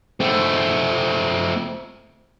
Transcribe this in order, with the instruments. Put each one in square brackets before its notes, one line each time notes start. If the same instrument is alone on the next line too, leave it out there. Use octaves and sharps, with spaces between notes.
[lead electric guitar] A3 C4